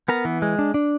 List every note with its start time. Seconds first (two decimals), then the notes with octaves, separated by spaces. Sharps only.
0.08 B3 A#4 A#5
0.25 E3
0.42 G#3
0.59 D4
0.74 D4